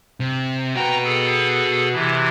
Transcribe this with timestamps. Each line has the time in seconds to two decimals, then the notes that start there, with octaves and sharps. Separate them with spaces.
0.20 C3
0.76 F#4 B4 G5 A#5
1.05 G#4 A4
1.93 C3 E3 E4